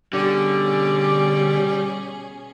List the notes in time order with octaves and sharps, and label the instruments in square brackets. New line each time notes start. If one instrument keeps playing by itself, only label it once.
[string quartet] B2 C#4 G#4 [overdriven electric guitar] D3 [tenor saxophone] G3 [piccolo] D6